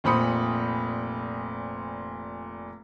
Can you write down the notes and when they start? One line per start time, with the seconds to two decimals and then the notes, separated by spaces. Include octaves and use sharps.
0.04 F1 A#2 C5 B5 D#6 C#7